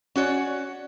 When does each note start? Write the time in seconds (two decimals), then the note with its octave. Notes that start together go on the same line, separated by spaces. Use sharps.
0.16 C#4 F#4 C#5 D5